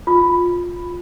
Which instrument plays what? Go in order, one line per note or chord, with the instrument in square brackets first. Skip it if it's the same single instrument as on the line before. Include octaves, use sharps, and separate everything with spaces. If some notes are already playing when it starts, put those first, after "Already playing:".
[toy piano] F4